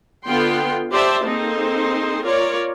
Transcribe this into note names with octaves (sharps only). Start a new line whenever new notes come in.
D3 B3 F4 G5 C6
G4 C5 D5 E5 A5
A#3 C4 D#4 G#4 A4 C5
F4 A#4 C#5 D5